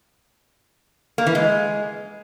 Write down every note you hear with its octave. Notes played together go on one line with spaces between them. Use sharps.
A#3
E3
G#3